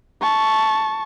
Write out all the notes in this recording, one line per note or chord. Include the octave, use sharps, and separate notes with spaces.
A5 C#6